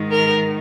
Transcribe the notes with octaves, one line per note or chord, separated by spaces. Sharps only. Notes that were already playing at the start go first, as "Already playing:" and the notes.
Already playing: G#2 D#3
A#4